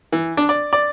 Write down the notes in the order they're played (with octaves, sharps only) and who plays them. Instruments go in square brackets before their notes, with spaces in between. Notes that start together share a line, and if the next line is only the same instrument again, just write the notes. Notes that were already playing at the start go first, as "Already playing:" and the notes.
[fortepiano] E3
D4
D5
D5